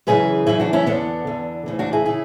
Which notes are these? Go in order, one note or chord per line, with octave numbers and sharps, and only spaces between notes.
F#2 C#3 E3 G#4 B4
F#2 C#3 E3 E4 G#4
D4 F#4
C#4 E4
E2 D3 B3 D4
E2 D3
D2 C#3 E3
D4 F#4
E4 G#4
C#3 E4 G#4